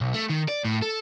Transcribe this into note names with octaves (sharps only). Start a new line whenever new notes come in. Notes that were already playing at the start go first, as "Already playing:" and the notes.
B1
A3
D#3
D5
A2
A4